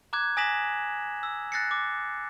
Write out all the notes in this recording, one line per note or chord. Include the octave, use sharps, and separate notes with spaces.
A#5 D6 F#6 G#6
G#5 D#6 A#6 B6 E7 F#7
E6
F#6 A6 A#6 C7 C#7
D6